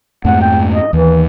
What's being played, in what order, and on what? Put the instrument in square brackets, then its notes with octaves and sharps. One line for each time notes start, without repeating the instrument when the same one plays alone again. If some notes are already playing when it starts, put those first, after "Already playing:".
[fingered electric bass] F2 G#2 A3 [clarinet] F#5
[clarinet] G5
D#5
[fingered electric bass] D#2 [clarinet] E3